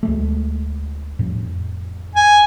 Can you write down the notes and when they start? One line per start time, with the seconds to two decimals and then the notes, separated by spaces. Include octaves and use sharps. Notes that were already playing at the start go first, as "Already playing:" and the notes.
0.03 D2 G#3 A3
1.19 F2 A2
2.15 G#5